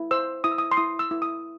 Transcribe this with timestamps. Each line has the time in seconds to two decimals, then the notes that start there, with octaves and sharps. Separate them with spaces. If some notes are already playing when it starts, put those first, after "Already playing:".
Already playing: E4
0.11 C5 E6
0.44 E4 D#6
0.52 E6
0.58 D#6
0.72 C6
0.77 E4 D#6
0.99 E6
1.11 E4
1.22 D#6